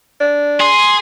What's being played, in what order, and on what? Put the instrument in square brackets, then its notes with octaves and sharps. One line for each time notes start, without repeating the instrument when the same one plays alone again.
[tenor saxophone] D4
[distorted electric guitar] G#4 [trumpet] C6